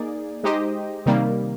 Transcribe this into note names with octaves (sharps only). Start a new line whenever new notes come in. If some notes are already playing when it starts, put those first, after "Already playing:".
Already playing: A#3 D#4 G#4 D5
G#3 D#4 G4 C5 D#5
C3 D#3 G3 A#3